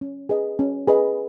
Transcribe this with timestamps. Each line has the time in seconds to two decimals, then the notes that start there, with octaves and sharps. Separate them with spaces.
0.01 C#4
0.29 G#4 B4 D#5
0.59 C#4
0.87 G#4 B4 D#5